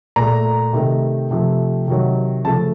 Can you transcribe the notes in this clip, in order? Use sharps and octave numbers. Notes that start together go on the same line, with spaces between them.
A#2 A3 A#5
C3 D#3 A3
C3 F3 A3
C3 D#3 F#3
C#3 F3 A3 A5